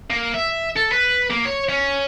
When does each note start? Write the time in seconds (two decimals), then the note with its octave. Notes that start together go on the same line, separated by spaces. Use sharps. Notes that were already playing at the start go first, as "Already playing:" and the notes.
0.10 A#3
0.34 E5
0.77 A4
0.93 B4
1.31 A#3
1.45 C#5
1.69 C#4